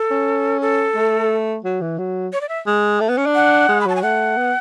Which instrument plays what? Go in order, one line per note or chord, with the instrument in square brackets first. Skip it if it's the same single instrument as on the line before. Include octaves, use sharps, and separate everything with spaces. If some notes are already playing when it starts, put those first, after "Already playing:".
Already playing: [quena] A4
[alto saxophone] C#4
[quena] A4
[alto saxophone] A3
F#3
E3
F#3
[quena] C#5
D5
E5
[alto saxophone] G#3
A3
B3
C#4
D4
[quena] F#5
[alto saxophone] G#3
[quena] B5
[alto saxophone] F#3 [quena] A5
[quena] G#5
[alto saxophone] A3 [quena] F#5
[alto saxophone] B3